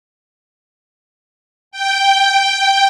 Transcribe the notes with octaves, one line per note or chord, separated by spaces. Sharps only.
G5